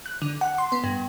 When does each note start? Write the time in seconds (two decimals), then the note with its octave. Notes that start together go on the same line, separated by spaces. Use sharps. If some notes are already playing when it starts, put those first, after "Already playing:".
0.06 F#6
0.22 D3
0.41 F#5
0.58 C6
0.72 B3
0.84 G2